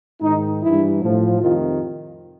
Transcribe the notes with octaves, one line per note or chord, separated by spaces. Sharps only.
G#2 D#3 D#4
G2 E3 E4
A2 F3
F2 C3 D#3 F4